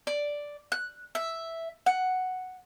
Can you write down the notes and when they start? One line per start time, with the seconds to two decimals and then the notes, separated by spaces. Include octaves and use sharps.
0.07 D5
0.72 F#6
1.15 E5
1.86 F#5